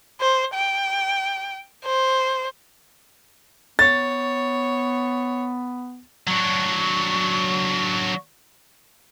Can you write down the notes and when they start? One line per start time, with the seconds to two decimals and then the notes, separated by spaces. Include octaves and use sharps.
0.21 C5
0.54 G5
1.85 C5
3.79 B3 C#5 A6
6.27 F#3 D4 C#6